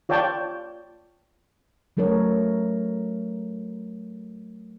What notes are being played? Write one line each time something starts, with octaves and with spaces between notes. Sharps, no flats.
F4 C#5 D5 G5 A5
F#3 A3 A4 A#4 C#5